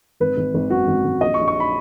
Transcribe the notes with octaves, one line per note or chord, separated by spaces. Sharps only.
G#1 B4
G#1
G#1
F#2 F#4
G#1
G#1
A#1 D#5
C#6
A#1
C#6
B5